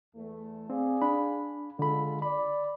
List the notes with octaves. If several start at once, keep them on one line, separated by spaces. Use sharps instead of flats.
E2 A3
C4 G#4 D5 F5
D4 B5
D3 G#3 F4 A4 B5
D5 B5